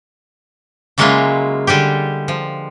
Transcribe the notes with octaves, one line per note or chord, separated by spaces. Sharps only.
C#3 F#3 G#3 A#3 E4 F4
D3 G3 G#3 G4
F3